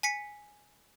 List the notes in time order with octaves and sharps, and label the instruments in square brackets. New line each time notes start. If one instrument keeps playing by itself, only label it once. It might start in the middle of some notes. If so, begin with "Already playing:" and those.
[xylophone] G#5 B6 C#7